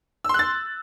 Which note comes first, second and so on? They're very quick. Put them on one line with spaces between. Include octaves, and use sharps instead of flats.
E6 C6 F#6 A6